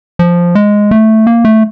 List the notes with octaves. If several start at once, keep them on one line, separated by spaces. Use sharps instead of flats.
F3
G#3
A3
A#3
A3